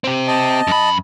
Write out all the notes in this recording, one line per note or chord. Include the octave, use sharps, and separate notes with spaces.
C4 G4
D#5 A5
F#2 B5